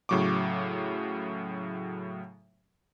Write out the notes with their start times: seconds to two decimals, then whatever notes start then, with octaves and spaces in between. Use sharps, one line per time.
0.09 A2 C#3 F#3 C#6 D6